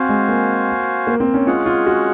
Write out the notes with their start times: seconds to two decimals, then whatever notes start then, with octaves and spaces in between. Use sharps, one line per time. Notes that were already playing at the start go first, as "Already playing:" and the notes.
Already playing: C4 F#4 C5 F5 G#5
0.09 G#3
0.28 A#3
1.07 A#3
1.20 C4
1.34 C#4
1.47 G#3 C#4 F4 G#4 C#5 F#5
1.66 F4
1.86 F#4